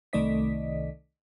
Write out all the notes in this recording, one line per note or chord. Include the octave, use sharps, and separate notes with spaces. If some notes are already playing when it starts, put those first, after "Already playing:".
C2 D#3 A3 D5 D#5 B6